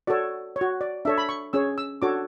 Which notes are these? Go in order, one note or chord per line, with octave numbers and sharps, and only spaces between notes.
F#4 A4 C#5 D5
C#5
F#4
D5
D4 A4 C#5 E5
B5
C#6
C#4 G#4 C#5 E6
E6
D4 F#4 A4 C#5 D6